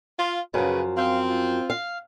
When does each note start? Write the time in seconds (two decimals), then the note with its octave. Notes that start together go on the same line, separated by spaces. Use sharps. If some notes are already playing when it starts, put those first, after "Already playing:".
0.18 F4
0.54 F#2 C#3 F3 B4
0.97 C4 F5
1.29 F4
1.70 F5